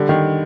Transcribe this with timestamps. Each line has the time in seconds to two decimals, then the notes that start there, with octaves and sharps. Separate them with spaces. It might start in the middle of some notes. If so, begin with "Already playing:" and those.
Already playing: D3 G3
0.09 D#3